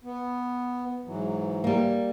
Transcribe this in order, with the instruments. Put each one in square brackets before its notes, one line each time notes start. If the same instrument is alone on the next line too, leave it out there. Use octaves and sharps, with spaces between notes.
[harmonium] B3
G#2 E3 F#3
[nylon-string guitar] G3 A#3